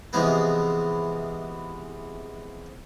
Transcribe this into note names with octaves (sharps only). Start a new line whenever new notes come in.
C3 E3 F3 G#3 B3 E4